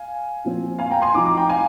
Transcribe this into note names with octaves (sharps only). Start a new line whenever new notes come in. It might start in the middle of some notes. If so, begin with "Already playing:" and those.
Already playing: F5 G#5
A#2 F3 C4
F5 G#5
G5 A#5
G#5 C6
F3 C4 D#4 A#5 D6
A#5 D6
G5 A#5
F5 G#5